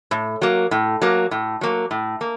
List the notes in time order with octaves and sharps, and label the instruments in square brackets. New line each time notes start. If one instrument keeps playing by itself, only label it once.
[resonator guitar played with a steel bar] A2
F#3 A#3
A2
F#3 A#3
A2
F#3 A#3
A2
A#3